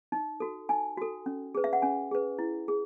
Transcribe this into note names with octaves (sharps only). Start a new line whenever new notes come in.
D#4
F#4 A4
D#4 G#5
F#4 A4
C#4
G#4 B4
E5
F#5
C#4 G#5
G#4 B4
E4
G#4